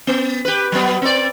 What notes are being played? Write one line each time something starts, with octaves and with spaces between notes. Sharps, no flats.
B3
G4 B4
F#3 B3
C4 D5